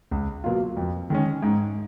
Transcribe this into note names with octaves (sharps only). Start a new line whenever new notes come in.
C#2
B2 F#3 A#3 F4
F2
D#3 G#3 C#4
G#2